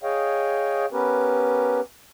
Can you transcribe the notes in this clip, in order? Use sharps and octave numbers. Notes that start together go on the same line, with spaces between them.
G#4 C#5 D#5 F5 G5
B3 C#4 G4 A#4 B4